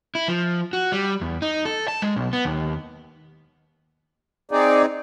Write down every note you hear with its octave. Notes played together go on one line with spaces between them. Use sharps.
E4
F3
F#4
G3
E2
D#4
A4
A5
G#3
B1
B3
D#2
C4 D#4 G#4 D5